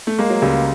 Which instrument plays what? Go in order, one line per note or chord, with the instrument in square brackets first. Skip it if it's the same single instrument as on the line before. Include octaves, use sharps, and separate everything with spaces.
[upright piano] A3
[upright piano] G#3 [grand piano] A#3
[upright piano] F#3
[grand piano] C#2 [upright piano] G3